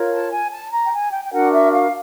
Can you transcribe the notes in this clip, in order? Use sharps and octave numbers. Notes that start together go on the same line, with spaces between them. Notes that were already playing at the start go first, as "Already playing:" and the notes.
Already playing: F4 A#4 C#5
A5
G#5
A5
A#5
G5
G#5
G5
G5
D4 F#4 A#4 F#5
E5
F5